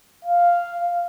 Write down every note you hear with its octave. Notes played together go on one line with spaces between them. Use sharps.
F5